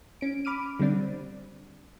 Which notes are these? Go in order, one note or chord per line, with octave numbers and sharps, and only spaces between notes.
C#4 D7
B5 D6 F6 D#7
D3 G3 C4 D4